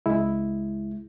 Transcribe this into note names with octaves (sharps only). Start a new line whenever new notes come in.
C#2 G#3 E4